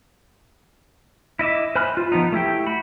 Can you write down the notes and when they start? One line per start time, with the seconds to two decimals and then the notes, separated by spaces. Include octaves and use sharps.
1.39 E4 D#5 E5 D6
1.76 C5 G#5 B5 F6 F#6
1.97 F4
2.12 F3 B3 D#4
2.32 A3 E4 G4 G5
2.66 F#4 B5